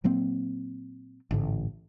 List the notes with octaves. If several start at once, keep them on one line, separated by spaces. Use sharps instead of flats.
A#2 F#3 A#3 C4
A1 G#2 D3